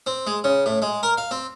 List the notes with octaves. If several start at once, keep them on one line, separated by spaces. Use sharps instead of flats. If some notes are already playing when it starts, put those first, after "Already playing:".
C4
G#3
C#3
A2
G#3
A#4
F5
C4